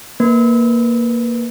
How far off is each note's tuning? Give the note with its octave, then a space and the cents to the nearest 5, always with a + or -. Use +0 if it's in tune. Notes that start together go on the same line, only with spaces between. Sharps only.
A#3 +0 B4 +0